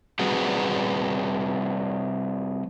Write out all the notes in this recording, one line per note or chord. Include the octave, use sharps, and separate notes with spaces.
G3 C4 F#4 G#4 B4 F#5